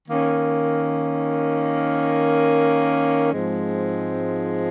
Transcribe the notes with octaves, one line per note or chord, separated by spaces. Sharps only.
D#3 A#3 C#4
G#2 F3 G#3 C4